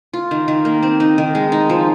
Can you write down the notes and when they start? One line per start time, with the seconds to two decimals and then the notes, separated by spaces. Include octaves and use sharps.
0.13 F4
0.31 D#3
0.48 D#3
0.65 A#3
0.83 C4
1.00 D#4
1.18 D#3
1.35 G#3
1.52 D#4
1.70 F3